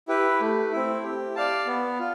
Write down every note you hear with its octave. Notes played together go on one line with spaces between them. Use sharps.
E4 G4 B4
A3
C4 E4
G4
D5 F5 A5
B3
F4